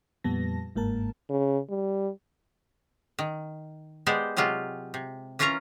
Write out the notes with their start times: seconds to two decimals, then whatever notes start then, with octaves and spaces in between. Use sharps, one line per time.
0.24 F2 A#2 G3 B3 A5 A#6
0.75 G1 G#2 A#3 A#4 A5
1.29 C#3
1.70 G3
3.19 D#3
4.06 G#3 B3 G4 C5 D5
4.37 C3 F#3 G#3 F4 G4
4.94 C3
5.39 E3 C#4 F4 A#4 C#5 A#5